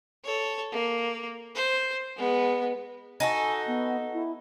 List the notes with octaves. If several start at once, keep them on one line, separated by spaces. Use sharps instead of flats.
A4 C#5
A#3
C5
G#3 B3
D#4 F#4 A4 G#5
B3
E4